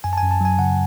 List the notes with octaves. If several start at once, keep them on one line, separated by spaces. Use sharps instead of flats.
F#2 G#5
A5
G#5
F#2
A5
F#3 G#5
C#3 F#5